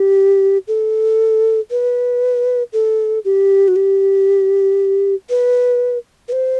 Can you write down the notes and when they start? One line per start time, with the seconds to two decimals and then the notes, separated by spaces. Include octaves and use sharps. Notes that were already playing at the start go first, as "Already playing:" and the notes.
Already playing: G4
0.68 A4
1.71 B4
2.73 A4
3.25 G4
3.68 F#4
3.76 G4
5.30 B4
6.28 B4
6.32 C5